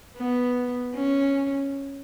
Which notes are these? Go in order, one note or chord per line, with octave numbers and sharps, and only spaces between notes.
B3
C#4